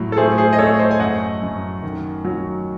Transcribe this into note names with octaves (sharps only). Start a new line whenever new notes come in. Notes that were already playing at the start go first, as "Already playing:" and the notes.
Already playing: A2 F#3
A4
A3 G#4 C5
G#4 C5
D#5
A3 A4 C#5
C5 D#5
G#5
F#2 D#5 F#5
F#2
D#3
F#3